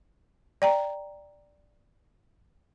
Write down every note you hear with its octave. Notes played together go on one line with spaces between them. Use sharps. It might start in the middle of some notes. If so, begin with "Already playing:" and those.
D5 G5 A#5